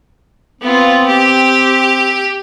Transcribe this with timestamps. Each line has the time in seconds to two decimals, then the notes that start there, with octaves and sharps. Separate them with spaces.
0.61 B3 C4 F4
1.07 G4